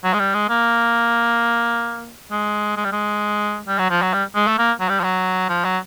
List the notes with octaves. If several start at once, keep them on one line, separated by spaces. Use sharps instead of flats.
F#3
G#3
G3
G#3
A#3
G#3
G#3
G3
G#3
G3
F#3
F3
F#3
G3
G#3
A3
A#3
F#3
G3
F3
F#3
F3
F#3